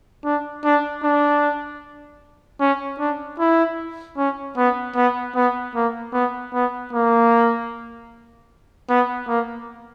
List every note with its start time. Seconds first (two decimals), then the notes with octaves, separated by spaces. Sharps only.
0.25 D4
0.65 D4
1.03 D4
2.61 C#4
2.99 D4
3.39 E4
4.18 C#4
4.57 B3
4.96 B3
5.36 B3
5.75 A#3
6.13 B3
6.54 B3
6.93 A#3
8.90 B3
9.28 A#3